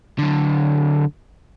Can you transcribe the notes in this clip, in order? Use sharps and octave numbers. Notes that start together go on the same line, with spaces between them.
D3 F#3